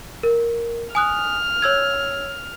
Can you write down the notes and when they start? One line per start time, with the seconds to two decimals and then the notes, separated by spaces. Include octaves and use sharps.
0.23 A#4
0.95 G#5 D#6 F6 F#6
1.62 C#5 E6 G#6